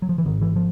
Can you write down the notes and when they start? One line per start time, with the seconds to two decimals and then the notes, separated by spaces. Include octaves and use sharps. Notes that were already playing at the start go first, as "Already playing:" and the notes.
0.02 F#3
0.09 F3
0.18 E3
0.25 G#1 G#2 D#3
0.41 E3
0.56 F3